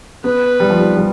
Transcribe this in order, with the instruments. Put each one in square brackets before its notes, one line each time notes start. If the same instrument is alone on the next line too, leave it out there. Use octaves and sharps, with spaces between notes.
[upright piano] B3 [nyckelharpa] B4
[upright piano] G3
F3
G3
G3